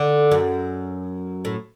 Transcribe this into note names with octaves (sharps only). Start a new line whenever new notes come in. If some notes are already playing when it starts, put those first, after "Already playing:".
Already playing: D3
F#2
A2